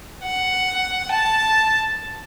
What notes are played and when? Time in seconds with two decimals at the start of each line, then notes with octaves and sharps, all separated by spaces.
0.24 F#5
1.11 A5